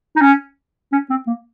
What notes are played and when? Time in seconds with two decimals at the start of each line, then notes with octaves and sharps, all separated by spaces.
0.16 D#4
0.21 C#4
0.92 C#4
1.10 C4
1.27 A#3